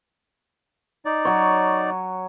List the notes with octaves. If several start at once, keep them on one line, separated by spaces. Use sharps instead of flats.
D#4 D5
F#3 C#5